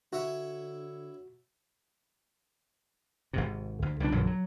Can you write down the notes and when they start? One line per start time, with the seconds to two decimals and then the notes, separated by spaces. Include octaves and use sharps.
0.13 D3 E4 F#4 C#5 E5
3.33 G#1 G#2 C3
3.82 D2
4.00 C#2 G3 A3 D4
4.12 A#1 F#2 D3 E3
4.27 F#3